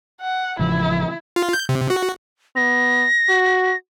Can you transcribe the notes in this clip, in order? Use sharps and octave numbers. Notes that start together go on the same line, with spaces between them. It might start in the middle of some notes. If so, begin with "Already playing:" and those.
F#5
A1 C#3 F3 E4
F4
G6
C3
F#4
B3 A#6
F#4